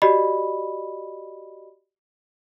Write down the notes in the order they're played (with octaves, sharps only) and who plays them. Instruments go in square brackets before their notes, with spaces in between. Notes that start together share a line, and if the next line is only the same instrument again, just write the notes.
[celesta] F#4 G4 D5 D#5 B5